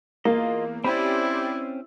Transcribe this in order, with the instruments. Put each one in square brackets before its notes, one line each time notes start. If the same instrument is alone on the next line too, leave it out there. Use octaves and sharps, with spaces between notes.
[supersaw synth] E2 [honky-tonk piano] A#3 [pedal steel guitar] F4 D#5
[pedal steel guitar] C4 C#4 E5 [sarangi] E4 [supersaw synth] G4 C5 D5 [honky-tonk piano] B5